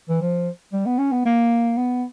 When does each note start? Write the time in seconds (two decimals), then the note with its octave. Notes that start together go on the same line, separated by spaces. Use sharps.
0.09 E3
0.21 F3
0.73 G3
0.86 B3
0.99 C#4
1.12 B3
1.25 A#3
1.77 B3